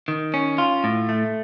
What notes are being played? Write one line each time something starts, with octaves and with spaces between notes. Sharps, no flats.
D#3
C#4
F4
A2
A3